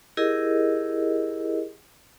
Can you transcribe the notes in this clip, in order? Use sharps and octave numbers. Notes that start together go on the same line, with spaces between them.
E4 G4 G#4 A#4 D#5